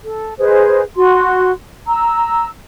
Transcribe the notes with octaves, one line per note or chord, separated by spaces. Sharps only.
A4
G#4 B4 C5 D#5
F#4 C6
A#5 E6